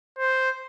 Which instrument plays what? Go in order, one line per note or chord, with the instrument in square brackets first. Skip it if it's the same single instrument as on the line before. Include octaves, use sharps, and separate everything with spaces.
[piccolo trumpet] C5